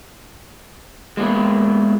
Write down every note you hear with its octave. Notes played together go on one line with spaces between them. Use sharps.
G#3 A#3 B3 E4